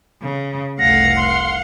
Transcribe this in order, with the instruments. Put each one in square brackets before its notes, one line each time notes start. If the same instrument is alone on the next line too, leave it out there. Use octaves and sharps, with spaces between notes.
[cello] C#3
[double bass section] F1 C2 A3 [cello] F5 F#5 [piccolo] A#6
[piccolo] C6